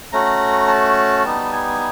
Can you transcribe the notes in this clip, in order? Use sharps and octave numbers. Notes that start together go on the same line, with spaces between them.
A3 C#4 F#4 A#5
A5
G3 B3 D#4
G#5